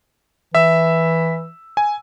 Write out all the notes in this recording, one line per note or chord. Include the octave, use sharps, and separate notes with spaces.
E3 E5 E6
G#5